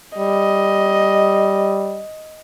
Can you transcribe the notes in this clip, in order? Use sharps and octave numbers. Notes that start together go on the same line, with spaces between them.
G3 D#5